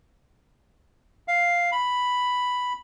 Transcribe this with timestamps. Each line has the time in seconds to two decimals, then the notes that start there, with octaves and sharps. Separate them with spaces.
1.28 F5
1.72 B5